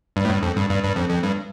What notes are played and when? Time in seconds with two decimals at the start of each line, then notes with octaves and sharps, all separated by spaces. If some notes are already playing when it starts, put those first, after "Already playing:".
0.16 G2
0.25 A2
0.30 G2
0.43 F2
0.57 G2
0.70 G2
0.84 G2
0.96 F2
1.10 F2
1.23 G2